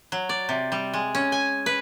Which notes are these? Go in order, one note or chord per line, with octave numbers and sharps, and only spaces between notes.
F#3
D5
C3
G3
G#3
C#4
G#5
B4